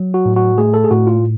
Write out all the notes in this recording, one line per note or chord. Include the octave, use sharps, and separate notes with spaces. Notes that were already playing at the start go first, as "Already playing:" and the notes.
Already playing: F#3
F#4
A2
F#4
A3 G#4
A4
G#4
A2 F#4
F4